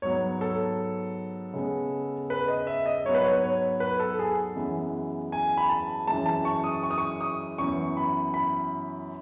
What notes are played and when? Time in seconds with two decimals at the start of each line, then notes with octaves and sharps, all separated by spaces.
0.02 G#2 F#3 B3 C#5
0.41 A4
1.54 C#3 G#3 B3
2.30 B4
2.48 D#5
2.67 E5
2.86 D#5
3.05 G#2 F#3 B3 C#5
3.14 B4
3.24 C#5
3.44 C#5
3.80 B4
4.00 A4
4.19 G#4
4.56 F#2 E3 G#3 B3
5.32 G#5
5.57 B5
5.69 A5
6.07 F#2 E3 G#3 A5
6.26 A5
6.45 C#6
6.64 D#6
6.83 C#6
6.91 D#6
6.98 C#6
7.21 D#6
7.58 F#2 E3 B3 C#6
7.97 B5
8.34 B5